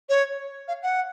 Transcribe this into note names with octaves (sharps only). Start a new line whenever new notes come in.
C#5
F5
F#5